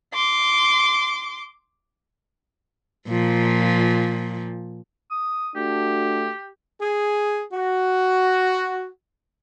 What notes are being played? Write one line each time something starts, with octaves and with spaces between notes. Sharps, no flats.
C6 D6
A#2 F3
D#6
A3 D4 F#4 G4
G#4
F#4